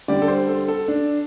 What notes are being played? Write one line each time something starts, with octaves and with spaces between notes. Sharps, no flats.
D3 G3 D5
A4
C5
A4
A4
D4